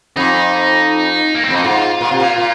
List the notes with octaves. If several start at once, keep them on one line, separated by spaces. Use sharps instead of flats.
F2 D#4
A#3
C4
F2 D#4
G#2 F4
A#2
C3
A#2
A#2